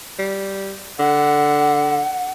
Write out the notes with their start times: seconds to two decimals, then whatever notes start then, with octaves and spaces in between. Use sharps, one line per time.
0.19 G3
0.99 D3 F#5